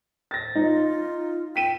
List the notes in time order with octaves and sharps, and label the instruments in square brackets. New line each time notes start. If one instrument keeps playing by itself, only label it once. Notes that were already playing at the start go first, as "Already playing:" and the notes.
[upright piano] A6 A#6
[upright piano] D#4 [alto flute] F4
[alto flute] G5 [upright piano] B6 D#7 E7